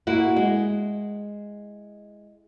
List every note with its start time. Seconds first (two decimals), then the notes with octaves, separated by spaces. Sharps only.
0.07 A#3 E4 F#4
0.36 G#3